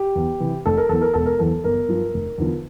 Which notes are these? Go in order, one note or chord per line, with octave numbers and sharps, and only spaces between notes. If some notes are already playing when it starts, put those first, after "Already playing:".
Already playing: G4
E2
C3 E3
F1 A4
A#4
E2 E3 A4
A#4
E1 A4
A#4
E2 E3 A4
G1 A#4
G2 F3
F1
E2 D3 F3